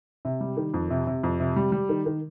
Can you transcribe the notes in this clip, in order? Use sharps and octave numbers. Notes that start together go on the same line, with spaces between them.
C3
G3
D#3
F2
C3
C3
F2
C3
G3
G3
D#3
D#3